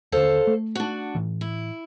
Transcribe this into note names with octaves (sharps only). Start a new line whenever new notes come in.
D#2 D3 A4 C5 F5
A3
D4 F#4
A2 E3
E4